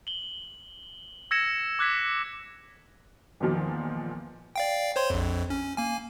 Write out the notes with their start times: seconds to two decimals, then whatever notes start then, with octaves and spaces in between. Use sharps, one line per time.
0.07 F#7 G7
1.31 E6 G#6 A#6 C#7 E7
1.79 D6 F#6 G#6 B6
3.40 E2 A#2 D#3 F3
4.56 D5 F5 G5
4.96 C5 C#5 C6
5.10 A#1 F2
5.50 C#4
5.77 A#3 G#5